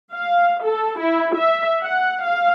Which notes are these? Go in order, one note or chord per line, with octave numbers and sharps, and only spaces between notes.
F5
A4
E4
E5
F#5
F5